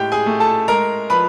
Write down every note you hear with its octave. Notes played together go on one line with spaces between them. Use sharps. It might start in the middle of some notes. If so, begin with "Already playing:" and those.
Already playing: A2 G#3 G4 G5
G#4 G#5
A3
A4 A5
G#3 A#4 A#5
F3 B4 B5